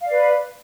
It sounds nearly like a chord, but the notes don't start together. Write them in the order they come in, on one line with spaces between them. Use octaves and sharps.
F5 D5 B4